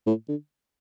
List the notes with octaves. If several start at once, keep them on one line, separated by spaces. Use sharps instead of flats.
A2
D3